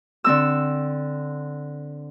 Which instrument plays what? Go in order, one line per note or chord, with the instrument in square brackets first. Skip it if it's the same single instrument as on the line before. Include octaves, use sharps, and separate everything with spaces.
[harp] D3 C4 E6